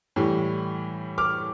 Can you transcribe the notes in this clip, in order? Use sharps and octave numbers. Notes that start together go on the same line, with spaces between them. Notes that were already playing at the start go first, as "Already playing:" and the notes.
A2 E3 G3
D6 F6